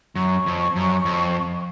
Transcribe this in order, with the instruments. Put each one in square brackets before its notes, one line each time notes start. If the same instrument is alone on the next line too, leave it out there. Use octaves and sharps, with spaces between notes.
[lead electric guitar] F#2 [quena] C#6
[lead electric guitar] F2
F#2
F2